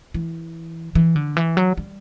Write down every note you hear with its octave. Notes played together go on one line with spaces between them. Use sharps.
E3
E3
D3
E3
F#3
G3